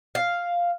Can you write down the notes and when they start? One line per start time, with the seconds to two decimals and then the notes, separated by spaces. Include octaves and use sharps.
0.15 F5